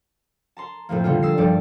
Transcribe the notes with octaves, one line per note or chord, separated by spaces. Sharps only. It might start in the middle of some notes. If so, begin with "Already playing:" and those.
A5 A#5 C6
F2 A2 F3 A#3
D3 G3 A#3 B3 F4
D#6 E6 A6 A#6 C7
G2 F3 G3 A4 D5